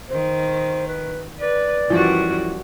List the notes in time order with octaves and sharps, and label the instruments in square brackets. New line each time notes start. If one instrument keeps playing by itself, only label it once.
[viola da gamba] D#3 [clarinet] C5
[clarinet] B4
[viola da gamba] B4 [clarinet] D5
[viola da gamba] F#2 G3 F#4 [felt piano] E3 F3